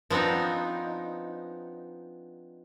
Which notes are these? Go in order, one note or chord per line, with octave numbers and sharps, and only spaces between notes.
F3 B3 C4 D4 D#4